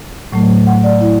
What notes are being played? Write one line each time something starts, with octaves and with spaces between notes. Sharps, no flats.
A2 F#3 A3
F#5
D5
E4